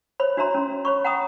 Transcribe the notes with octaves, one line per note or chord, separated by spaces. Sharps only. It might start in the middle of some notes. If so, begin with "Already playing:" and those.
C5 C#5 B5
D4 F#4 C#5 E5 A#5 C6
C#4
C#5 B5 C#6
F#5 G5 A#5 B5 C#6 D#6